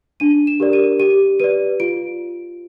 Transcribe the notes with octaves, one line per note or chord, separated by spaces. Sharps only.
D4 D#7
E7
G4 A#4 D5
D#7
G4 D#7
B4 D5 D#7
F4 D7